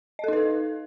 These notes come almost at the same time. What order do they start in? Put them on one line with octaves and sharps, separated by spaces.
D#5 A4 D#4 B4